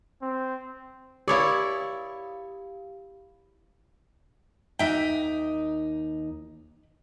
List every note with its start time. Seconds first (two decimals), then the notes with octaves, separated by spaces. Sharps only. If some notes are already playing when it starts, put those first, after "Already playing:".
0.22 C4
1.28 E4 G4 C#5 D5 F5
4.79 D#2 D#4 F#4 E5 G5